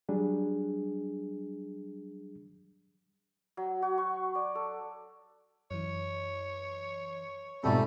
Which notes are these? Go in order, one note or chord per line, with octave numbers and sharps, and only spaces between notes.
F#3 G3 D4 G#4
F#3
F#4
C#6
D5
A4
F#2 E3 C#5
G#2 B2 G3 A3 C4 F4 G4 A4